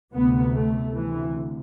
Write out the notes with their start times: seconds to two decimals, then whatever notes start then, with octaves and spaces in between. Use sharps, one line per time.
0.14 D2 C3 B3
0.54 A3
0.93 D2 C3 E3